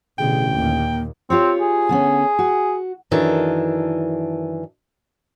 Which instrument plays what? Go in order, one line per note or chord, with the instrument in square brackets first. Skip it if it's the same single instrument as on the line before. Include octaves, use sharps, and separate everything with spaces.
[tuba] A1 [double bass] B2 D3 [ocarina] G#4 [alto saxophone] G5
[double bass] D#2 A#2 [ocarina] A#3
[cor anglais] C4 [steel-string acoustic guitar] F4 G4 C#5
[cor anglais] G#4
[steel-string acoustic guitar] D3 B3 C#4
F#4
F#2 D#3 E3 D4 A4